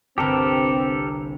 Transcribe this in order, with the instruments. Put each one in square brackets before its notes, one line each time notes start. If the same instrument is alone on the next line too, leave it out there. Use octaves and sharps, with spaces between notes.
[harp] G1 C2 [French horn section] C4 [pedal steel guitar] G4 A4 A#4